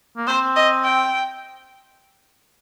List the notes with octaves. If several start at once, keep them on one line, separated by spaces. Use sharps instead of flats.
A#3
C4 C5
D#5
G5